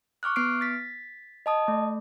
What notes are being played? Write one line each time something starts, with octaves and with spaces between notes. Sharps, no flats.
C#6 D6 F6 F#6
B3 F6 C7 D7
A6 B6
D#5 A5 D#6
A3